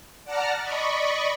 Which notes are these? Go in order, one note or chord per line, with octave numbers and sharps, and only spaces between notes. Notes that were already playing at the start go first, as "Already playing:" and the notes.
D5 F#5 A5 A#5 F6
D5 D#5 B5 C#6